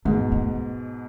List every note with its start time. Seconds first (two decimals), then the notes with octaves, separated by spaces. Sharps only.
0.05 G#2 B2 A3
0.32 A3